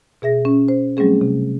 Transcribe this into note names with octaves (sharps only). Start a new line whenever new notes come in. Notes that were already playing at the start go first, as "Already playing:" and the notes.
B2 G#4 E5 A#6
C#4
C5
F#3 G3 A3 C4 C#4 G#4
C3